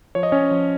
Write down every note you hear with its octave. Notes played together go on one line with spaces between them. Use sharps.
F3 C#5
D#5
C#4 C#5
F3